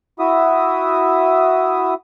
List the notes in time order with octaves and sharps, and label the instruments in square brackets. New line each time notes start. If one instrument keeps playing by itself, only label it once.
[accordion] E4 F#4 E5 D#6